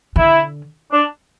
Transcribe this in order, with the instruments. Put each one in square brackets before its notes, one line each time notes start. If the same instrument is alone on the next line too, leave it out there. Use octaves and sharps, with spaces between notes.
[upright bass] D3 [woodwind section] E4
[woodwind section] D4